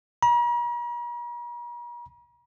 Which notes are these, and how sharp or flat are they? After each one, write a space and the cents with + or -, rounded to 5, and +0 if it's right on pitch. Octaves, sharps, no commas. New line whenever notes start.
A#5 +45